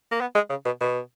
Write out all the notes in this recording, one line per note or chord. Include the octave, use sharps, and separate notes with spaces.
A#3
B3
G#3
C#3
B2
B2